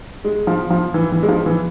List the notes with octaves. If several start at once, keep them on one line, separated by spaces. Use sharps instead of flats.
G#3
F3
F3
E3
E3
G#3
F3
E3